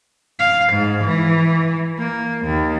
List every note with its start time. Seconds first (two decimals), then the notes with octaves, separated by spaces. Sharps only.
0.39 F5
0.73 G#2
1.04 E3
1.98 A#3
2.46 D#2